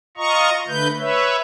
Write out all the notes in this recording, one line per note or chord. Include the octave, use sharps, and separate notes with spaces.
F4 D#5 A#5 C#6
D3 A3 B4 G6
B4 C#5 E5